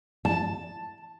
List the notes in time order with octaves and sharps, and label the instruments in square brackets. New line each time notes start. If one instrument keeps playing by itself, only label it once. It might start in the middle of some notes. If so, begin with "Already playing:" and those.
[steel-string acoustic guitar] A5